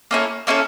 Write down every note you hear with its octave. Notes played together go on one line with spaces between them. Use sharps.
A#3 C#4 E4 A4
A#3 C#4 E4 A4